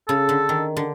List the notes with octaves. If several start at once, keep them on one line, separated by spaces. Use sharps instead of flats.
C#3 A4
D3
D#3
D3